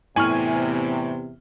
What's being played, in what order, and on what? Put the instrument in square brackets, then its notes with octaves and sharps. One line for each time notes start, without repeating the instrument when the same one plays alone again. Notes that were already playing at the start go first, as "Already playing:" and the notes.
[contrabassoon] E2 [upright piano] A2 F#7 [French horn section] C3 [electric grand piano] G#5 C#6 F6